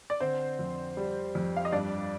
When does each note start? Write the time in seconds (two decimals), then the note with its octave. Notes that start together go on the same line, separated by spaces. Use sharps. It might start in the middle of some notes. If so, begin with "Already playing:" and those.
0.10 D5
0.20 D3 C4 C5
0.59 F2
0.97 G3
1.35 F2
1.57 F5
1.65 D#5
1.72 G2 D4 D5